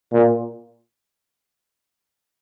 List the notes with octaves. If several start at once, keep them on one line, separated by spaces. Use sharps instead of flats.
A#2